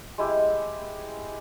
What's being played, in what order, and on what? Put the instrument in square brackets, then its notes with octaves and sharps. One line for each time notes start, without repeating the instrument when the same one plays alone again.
[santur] G#3 E4 G4